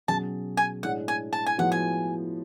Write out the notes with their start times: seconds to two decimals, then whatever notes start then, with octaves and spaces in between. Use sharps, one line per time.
0.08 B2 F#3 C#4 G#4 A5
0.57 G#5
0.83 A2 G#3 D4 F#5
1.08 G#5
1.33 A5
1.46 G#5
1.58 A2 F3 G#3 B3 F#4 F#5
1.72 G#5